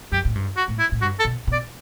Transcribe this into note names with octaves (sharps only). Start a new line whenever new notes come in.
F#2 G4
A2
G2
F#4
A2
E4
A2
G2 F#4
A4
B2
B2
D5